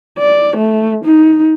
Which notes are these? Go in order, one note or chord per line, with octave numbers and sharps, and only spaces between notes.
D5
A3
D#4